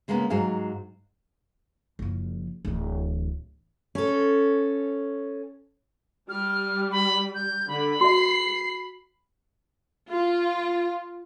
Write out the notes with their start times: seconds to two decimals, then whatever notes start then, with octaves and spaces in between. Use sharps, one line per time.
0.08 C#3 G#3 A#3 B3 C#4
0.30 G#2 F#3 G#4 F5
1.99 F#1 F3
2.65 D1 E3
3.95 C#4 A4
6.29 G3 F6
6.91 B5
7.35 G6
7.68 D3 B5
8.01 F#4 E5 C7
10.09 F4